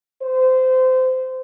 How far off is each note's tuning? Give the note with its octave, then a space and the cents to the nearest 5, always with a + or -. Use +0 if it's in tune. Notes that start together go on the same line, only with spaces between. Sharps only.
C5 -25